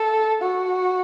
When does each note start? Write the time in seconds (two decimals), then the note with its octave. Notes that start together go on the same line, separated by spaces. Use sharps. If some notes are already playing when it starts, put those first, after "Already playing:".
Already playing: A4
0.42 F#4